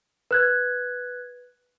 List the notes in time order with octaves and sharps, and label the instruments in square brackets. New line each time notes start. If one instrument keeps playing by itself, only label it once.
[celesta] B4 F#6 G#6